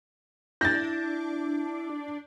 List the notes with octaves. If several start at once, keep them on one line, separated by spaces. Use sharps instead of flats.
D4 E4 G6 A6 A#6